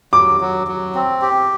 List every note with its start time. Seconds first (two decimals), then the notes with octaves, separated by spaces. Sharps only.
0.13 F#3 D6
0.41 F#3
0.67 F#3
0.95 C4
1.21 G4